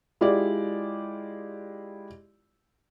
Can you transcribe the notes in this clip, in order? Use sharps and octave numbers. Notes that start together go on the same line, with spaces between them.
G#3 E4 F4 G4 D5